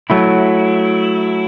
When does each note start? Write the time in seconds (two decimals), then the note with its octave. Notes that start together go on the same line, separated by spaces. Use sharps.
0.10 F#3 A3 E4